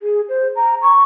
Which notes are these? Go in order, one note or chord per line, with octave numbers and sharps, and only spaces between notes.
G#4
C5
A#5
C#6